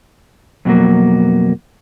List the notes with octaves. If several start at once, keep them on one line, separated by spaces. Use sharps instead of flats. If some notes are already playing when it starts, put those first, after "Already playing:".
F2 B2 E3 F#3 A#3